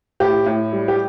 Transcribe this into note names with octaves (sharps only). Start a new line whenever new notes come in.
A2 G4
A2
G3
G4